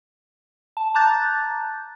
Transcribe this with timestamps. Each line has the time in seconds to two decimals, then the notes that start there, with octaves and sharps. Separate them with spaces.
0.77 A5
0.94 A5 A#5 D6 F#6 G6 A6